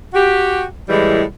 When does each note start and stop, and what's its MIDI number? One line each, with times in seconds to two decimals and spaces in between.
0.13 0.62 66
0.13 0.62 67
0.89 1.22 45
0.89 1.22 52
0.89 1.22 55
0.89 1.22 56